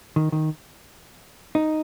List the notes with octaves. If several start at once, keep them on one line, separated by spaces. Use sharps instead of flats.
D#3
D#3
D#4